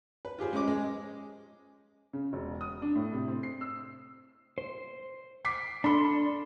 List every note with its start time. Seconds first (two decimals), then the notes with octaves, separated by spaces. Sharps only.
0.25 B4
0.38 F4 G4 G#4 C5
0.53 G#3 C#4 D#5 D6
0.68 G#3
2.13 C#3
2.33 E1
2.61 D#6
2.82 D4
2.96 A2
3.12 C3
3.28 C4
3.43 C7
3.61 E6
4.58 C5
5.45 D6 B6 C7
5.84 D4 A4 B5 C6